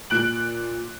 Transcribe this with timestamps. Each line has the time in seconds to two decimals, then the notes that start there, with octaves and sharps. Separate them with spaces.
0.10 A#2 F#6 D7 F#7